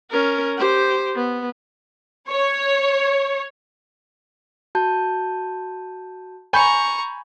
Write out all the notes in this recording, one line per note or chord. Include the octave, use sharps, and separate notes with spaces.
C#4 A#4
G4 C5
B3
C#5
F#4 A5 G6
G#5 A#5 B5 C#6 G6